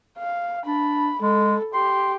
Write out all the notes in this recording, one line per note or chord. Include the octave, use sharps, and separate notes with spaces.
F5
D4 B5
G#3 A4
G4 C6